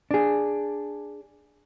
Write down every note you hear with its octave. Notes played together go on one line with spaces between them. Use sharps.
D4 G#4